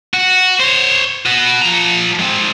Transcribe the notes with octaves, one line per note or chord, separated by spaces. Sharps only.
F#4
C5 C#5
F#4 B4
F3 A#5
G#3 C4